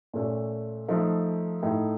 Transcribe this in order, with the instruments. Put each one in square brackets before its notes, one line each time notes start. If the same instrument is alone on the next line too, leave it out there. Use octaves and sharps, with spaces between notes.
[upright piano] A#2 A3 C#4
F3 A3 D#4
A2 A3 D#4